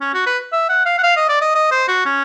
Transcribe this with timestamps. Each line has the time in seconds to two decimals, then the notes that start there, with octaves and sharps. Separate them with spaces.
0.01 C#4
0.14 F#4
0.27 B4
0.53 E5
0.69 F#5
0.86 F5
0.98 F#5
1.03 F5
1.17 D#5
1.29 D5
1.42 D#5
1.55 D#5
1.71 C5
1.88 F#4
2.05 C#4